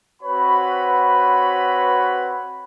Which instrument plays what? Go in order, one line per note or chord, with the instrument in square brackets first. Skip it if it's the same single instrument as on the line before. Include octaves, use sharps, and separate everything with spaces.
[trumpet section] C4 F#4 B4 C#5 F#5 B5